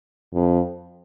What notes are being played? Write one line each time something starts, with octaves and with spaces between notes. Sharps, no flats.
F2